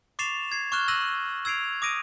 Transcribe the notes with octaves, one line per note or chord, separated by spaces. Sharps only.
C#6 D6 A6 C7 E7 F7
G#6 C7
C#6 D6 F6 F#6 E7 G7
E6 F#6 A#6 D#7 F#7
E6 G#6 C7 D7 F7
D6 D#6 A#6 D7 D#7